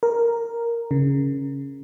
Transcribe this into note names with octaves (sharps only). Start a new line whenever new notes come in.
A#4
C#3